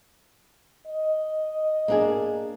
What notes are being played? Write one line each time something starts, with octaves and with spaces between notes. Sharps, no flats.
D#5
A#3 D4 G#4